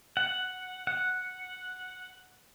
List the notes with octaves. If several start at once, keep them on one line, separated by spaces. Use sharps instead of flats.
F#5
F#5